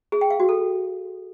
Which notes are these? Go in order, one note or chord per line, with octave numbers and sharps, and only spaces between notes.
G#4
G5
F5
F#4
A4